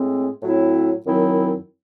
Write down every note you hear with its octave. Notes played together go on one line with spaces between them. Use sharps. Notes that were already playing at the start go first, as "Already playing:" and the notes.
Already playing: A2 G#3 C4
A2 F#3 C4 E4
F#2 D#3 F#3 C4 E4